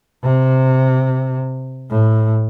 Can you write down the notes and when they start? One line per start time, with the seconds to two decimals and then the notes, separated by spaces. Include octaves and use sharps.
0.24 C3
1.90 A2